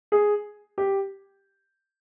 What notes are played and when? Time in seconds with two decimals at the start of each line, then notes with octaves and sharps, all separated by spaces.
0.12 G#4
0.78 G4